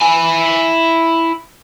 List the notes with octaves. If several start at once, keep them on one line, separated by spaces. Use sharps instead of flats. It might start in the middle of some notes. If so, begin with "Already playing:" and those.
E4 G#5